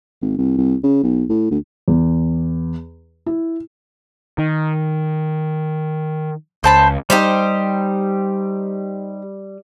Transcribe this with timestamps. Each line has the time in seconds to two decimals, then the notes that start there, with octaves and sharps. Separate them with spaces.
0.22 G#1
0.38 C2
0.57 C2
0.83 C#3
1.04 B1
1.30 A2
1.51 D2
1.88 E2
3.26 E4
4.38 D#3
6.64 C#2 C5 A5 B5
7.10 G3 D#4 G4 C5